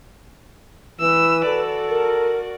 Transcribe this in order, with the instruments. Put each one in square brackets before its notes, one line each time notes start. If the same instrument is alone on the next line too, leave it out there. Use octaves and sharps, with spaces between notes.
[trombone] E3 [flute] B4 [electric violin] E6
[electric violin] F#4 D5 [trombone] A4
[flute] A#4